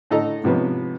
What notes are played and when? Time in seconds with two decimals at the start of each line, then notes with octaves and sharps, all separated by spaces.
0.11 A2 D3 A4 D#5 A#5
0.44 G#2 C3 F3 B3 C#4